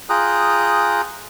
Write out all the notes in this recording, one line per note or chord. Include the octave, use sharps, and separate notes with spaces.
F4 G#4 G5 A#5 D#6 F#6